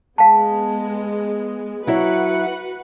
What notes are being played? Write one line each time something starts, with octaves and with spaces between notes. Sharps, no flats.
G#3 B3 F5 A5
F#3 E4 F#4 B4 C#5 F#5